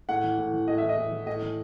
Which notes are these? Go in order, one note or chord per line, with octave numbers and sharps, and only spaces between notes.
A2 F#5
E3
A2
E3
A2 D#5
E3 E5
D#5
A2
E3
A2 D#5
E3